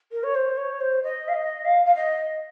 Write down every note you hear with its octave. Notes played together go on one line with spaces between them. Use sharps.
A#4
C#5
C5
C#5
C5
D#5
F5
D#5
F5
F5
D#5